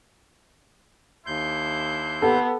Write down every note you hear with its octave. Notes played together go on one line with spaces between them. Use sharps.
D#2 D4 E4 C6 G6
B3 G4 A4